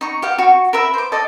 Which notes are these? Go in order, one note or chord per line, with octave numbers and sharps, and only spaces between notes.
D#4 A#5 C#6
G4 F5 F#5
F#4 C#6
A#4 B4 E5
C5 D6
A4 D5 D#5